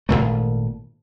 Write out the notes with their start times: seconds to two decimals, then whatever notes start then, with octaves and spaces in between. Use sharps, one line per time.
0.09 G#1 F2 A#2 A3